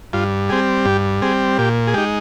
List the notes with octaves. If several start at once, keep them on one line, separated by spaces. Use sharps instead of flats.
G2 F4
G3 C4 G#4
G2 G4
G3 C4 G#4
A#2 G4
G#4
G#3 D#4 G4